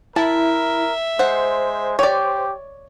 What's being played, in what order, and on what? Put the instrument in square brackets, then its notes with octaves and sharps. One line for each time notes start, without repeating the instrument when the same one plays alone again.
[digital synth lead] E4 [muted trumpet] A#4 [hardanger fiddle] E5 [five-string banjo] A5
[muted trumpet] G#3 [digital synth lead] C5 [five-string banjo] F#5
[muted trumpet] G4 [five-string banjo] C#5 D5